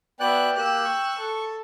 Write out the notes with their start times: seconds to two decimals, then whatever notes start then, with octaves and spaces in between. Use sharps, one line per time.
0.20 B3 F#4 D5 E5 G5 F#6
0.56 A#3 G4 E6 F#6
0.85 C#6
1.18 A4